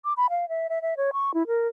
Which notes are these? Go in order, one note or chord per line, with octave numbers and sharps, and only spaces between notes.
D6
B5
F5
E5
E5
E5
C#5
C#6
E4
A#4